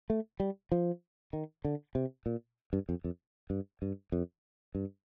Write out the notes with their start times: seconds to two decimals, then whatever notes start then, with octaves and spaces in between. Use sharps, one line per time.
0.10 A3
0.40 G3
0.72 F3
1.33 D#3
1.65 D3
1.95 C3
2.26 A#2
2.73 G2
2.89 F2
3.04 F2
3.50 G2
3.82 G2
4.12 F2
4.75 G2